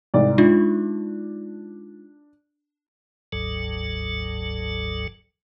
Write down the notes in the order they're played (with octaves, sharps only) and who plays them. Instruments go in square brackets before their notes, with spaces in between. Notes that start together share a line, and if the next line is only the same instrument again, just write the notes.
[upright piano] C2 G#2 D5
[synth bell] G#3 D#4 F4 [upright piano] D4
[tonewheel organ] G1 D2 G#2 F#3 A4